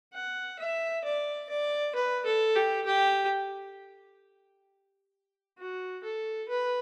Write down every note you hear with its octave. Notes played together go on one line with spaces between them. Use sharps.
F#5
E5
D5
D5
B4
A4
G4
G4
F#4
A4
B4